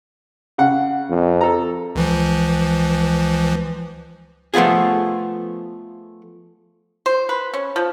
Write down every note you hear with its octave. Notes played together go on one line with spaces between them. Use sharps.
C#3 F#5
F2
A4 A#5
C#2 E3 F3
F3 A3 B3 F4 G#4
C5
B4
C#4
F3